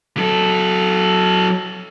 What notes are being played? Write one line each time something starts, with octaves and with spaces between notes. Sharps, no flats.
F#3 A4